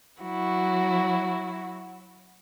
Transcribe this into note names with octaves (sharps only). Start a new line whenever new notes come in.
F#3 E4 F#4